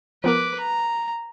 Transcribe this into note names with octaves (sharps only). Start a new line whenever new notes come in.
F3 B3 A#4 B4 D6
A#5